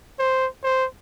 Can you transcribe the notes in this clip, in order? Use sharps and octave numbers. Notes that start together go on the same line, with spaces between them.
C5
C5